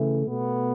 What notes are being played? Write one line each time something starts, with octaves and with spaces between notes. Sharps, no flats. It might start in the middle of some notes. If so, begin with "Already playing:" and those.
Already playing: C#3 E3 A3
B2 A3 B3